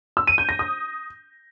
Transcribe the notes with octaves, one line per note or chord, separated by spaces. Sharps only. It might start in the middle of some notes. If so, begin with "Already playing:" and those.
E6
D#7
G6
A#6
D#6